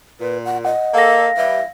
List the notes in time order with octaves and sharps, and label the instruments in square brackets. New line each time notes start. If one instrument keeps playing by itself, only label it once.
[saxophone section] A#2 [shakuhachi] B4
[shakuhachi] F#5
[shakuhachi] D#5 [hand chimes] F#5
[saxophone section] A#3 A4 [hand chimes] F5 A#6
[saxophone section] E3 G3 [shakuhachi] E5